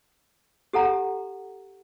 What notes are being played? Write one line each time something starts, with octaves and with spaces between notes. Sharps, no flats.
G4 A4 F#5 A#5